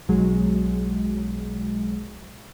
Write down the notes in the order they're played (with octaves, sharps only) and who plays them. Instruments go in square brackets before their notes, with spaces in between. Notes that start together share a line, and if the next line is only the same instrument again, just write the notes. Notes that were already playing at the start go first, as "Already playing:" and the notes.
[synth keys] B1 F#3 G#3